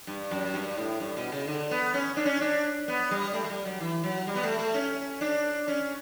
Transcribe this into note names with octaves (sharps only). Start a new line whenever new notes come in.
G2
F#2
G2
A2
G2
B2
C#3
D3
B3
C#4
D4
C#4
D4
B3
G3
A3
A3
G3
F#3
E3
F#3
G3
B3
A3
A3
C#4
D4
C#4